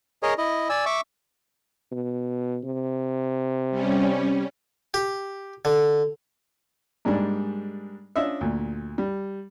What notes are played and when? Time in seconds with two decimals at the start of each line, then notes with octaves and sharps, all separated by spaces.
0.23 G#4 A#4 C#5 D#5
0.38 E4 D#5
0.69 D5 G#5 E6
0.86 E5 C#6 D6
1.92 B2
2.64 C3
3.71 G3 C#4
4.94 G4
5.65 D3
7.05 G#2 G3 G#3 A#3 D4
8.16 C#4 D4 F4 D#5 E5
8.41 D2 A#2
8.98 G3